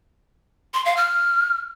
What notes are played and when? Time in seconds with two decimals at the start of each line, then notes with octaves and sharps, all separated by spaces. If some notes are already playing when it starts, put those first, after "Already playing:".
0.74 C6
0.85 F5
0.97 F6